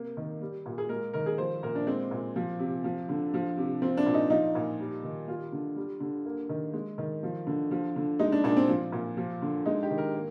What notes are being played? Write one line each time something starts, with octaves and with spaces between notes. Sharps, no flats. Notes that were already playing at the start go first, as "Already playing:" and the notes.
Already playing: C3 A#3
D#3
G3
A#2
G#4
G#3 A#4
D#3 A#4
G#4
F3 C5
A#2 A#4
D4
G#3 C4
A#2
F3
C3
F3
D3
F3
C3
F3 C4
D4
A#2
D#4
F3 D#4
A#2
G3
D#3
G3 F4
D3
G3
D3
A#3
D#3
G#3
D#3
F3
D3
F3
D3
G#3 D#4
D4
A#2 D4
C4
F3
A#2
F3
D3
G#3 D#4
G4
D#3
A#4
A#3